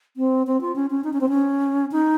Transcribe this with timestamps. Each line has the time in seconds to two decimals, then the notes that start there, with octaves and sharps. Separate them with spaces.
0.17 C4
0.47 C4
0.61 F4
0.76 C#4
0.90 C#4
1.04 D#4
1.13 C#4
1.21 C4
1.29 C#4
1.92 D#4